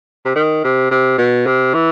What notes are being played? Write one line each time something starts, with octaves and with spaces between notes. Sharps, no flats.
C3
D#3
C3
C3
B2
C3
E3